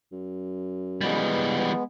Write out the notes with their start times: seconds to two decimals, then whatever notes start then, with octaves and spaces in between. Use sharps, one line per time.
0.12 F#2
1.01 E3 G3 G#3 B3